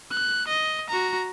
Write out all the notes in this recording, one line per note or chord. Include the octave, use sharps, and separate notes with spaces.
F#6
D#5
F#4 A#5